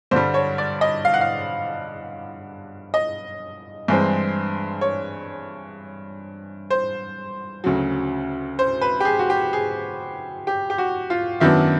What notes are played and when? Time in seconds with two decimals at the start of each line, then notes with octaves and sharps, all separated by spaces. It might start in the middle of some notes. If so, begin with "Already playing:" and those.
0.11 G2 D3 G3 C5
0.34 C#5
0.58 D5
0.81 D#5
1.05 F5
1.14 F#5
1.21 F5
2.94 D#5
3.88 G2 E3 G#3 C4
4.81 C#5
6.70 C5
7.64 D2 C#3 F#3
8.59 C5
8.81 B4
9.00 G4
9.05 G#4
9.19 F#4
9.30 G4
9.53 G#4
10.47 G4
10.70 G4
10.78 F#4
11.10 F4
11.40 F#2 D#3 F#3 B3 D4 E4